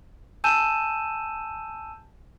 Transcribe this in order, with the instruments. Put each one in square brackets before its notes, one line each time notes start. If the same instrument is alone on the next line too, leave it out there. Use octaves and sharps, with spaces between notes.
[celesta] G#5 A5 E6 G6 D#7 E7